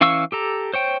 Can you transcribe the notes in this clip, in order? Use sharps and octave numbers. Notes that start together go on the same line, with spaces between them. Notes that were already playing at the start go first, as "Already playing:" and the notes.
E3 C#4 F5 C#6 E6
G4 A4 A#5
C5 C#5 G5